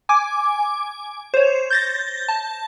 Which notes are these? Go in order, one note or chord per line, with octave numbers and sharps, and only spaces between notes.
G#5 D6
C5 C#5
G6 A6 A#6
A5